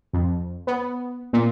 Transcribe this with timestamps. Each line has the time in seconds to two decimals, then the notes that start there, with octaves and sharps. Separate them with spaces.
0.13 F2
0.67 B3
1.33 A#2